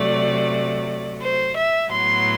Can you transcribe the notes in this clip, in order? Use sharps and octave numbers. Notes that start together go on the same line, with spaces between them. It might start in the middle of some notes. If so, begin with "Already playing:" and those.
Already playing: C3 F#3 A3 D5
C5
E5
A2 F#3 B3 C6